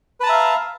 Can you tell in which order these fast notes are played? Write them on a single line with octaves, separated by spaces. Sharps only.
B4 A5 A#5 E5 F5